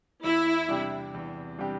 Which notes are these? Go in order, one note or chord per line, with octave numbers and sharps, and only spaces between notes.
E2 E4
C3 G3 D4 G4
E2
C3 G3 D4 G4